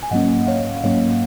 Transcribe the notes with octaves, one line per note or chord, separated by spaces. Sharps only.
G#5
G#2 F#3 A#3 C#4 D#5 F#5
C#5 F5
G#2 F#3 A#3 C#4 C#5 F5